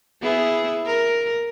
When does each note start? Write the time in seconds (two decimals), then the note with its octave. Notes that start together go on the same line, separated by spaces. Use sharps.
0.22 B3 E4 G#4
0.86 A#4